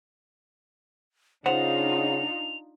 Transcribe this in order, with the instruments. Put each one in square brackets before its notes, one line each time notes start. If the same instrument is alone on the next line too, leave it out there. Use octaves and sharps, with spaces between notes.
[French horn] C#3 [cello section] D4 D#4 F4 [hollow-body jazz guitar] C5 F#5 [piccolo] F7